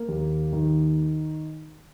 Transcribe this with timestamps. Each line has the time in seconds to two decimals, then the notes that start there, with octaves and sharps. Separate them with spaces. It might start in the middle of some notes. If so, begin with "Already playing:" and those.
Already playing: A#3
0.08 D#2
0.53 D#3